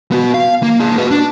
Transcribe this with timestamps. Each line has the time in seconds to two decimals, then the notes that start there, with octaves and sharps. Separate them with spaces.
0.12 B3 F#4
0.34 F5
0.63 A#3
0.80 A#3 G#4
0.98 F#4 B4
1.11 D4